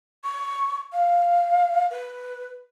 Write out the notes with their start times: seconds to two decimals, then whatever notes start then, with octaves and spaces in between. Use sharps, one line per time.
0.24 C#6
0.93 F5
1.90 B4